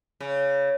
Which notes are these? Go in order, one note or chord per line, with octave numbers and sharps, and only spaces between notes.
C#3